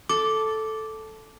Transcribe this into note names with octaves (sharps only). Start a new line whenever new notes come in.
A4 D6